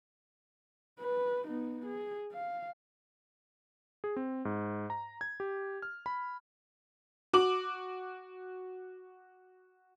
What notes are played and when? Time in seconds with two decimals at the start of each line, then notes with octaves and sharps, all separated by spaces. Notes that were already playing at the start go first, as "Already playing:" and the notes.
1.00 B4
1.46 B3 D#4
1.86 G#4
2.32 F5
4.04 G#4
4.16 C4
4.45 G#2
4.90 A#5
5.21 G#6
5.40 G4
5.82 F6
6.06 B5
7.33 F#4 D6 F#7